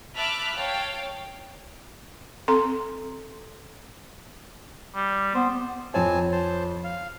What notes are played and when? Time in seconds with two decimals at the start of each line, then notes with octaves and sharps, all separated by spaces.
0.16 E5 A5 B5 D6 F6 F#6
0.55 C#5 F5 G5 A5
2.48 C4 A4 A#5 C6
4.95 G3
5.34 B3 C5
5.94 F2 C4 C#5 G#5 A5
6.32 C5 A5
6.84 F5